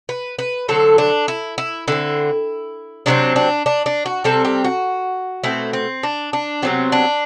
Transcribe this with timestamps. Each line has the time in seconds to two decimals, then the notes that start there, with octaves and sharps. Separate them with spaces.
0.09 B4
0.39 B4
0.68 D3 F#3 C4 A4
0.98 D4
1.28 E4
1.58 E4
1.88 D3 A3 E4
1.92 C4
3.06 C3 F#3 A3 C4 D4
3.36 D4
3.66 D4
3.86 D4
4.06 F#4
4.24 C3 G3 C4 A4
4.45 G4
4.64 F#4
5.44 B2 A3 C4 E4
5.73 C4
6.03 D4
6.33 D4
6.62 C3 F#3 B3 C4
6.92 D4